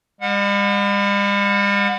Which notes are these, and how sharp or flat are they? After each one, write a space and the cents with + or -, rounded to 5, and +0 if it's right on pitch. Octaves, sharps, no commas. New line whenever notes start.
G3 +45 F#5 -25